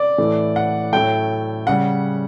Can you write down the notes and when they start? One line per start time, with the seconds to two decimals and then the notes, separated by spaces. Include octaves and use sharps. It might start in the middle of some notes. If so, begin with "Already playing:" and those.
Already playing: D5
0.18 A2 E3 A3
0.56 F#5
0.93 A2 F#3 A3 G5
1.67 C#3 G3 F#5